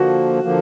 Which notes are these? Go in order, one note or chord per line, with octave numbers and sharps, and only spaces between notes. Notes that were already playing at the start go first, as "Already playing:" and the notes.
Already playing: D3 F3 A#3 F#4
D3 F3 A#3